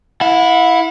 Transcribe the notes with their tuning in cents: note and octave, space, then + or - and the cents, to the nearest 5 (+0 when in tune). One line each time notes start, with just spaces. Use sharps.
E4 +0 F#5 -40